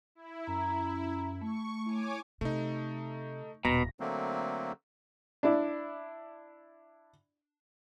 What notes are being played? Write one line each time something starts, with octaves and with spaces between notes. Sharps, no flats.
E4
F#2 A#5
A3 C#6
E4 C#5 G#5 D6
C3 A3 D#4
D#1 B2 A#5 A#6
D3 F#3 A3 A#3 C4
D4 E4 D5